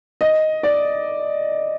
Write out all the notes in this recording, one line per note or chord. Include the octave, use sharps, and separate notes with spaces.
D#5
D5